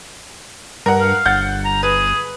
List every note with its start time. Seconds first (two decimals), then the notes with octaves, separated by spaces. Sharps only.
0.86 G2 A#4 F#5
1.00 F5
1.26 G1 F#5 G6 A6
1.65 A#5
1.83 G#4 B4